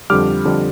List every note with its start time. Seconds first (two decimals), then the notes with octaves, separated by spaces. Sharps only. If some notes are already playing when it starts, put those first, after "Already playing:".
0.10 F2 D3 G3 D6 F6
0.45 F2 D3 G3